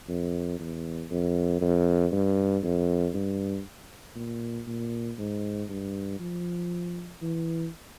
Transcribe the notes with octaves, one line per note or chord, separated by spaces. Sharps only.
F2
E2
F2
F2
G2
F2
G2
A#2
A#2
G#2
G2
F3
E3